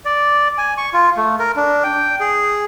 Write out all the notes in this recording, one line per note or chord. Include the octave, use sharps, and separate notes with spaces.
D5
G#5
C#6
F4
A3
A#4
D4
G5
G#4